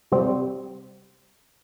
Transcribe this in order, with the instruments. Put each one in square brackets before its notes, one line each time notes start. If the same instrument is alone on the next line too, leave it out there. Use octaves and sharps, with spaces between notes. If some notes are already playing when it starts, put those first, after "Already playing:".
[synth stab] C3 G3 C4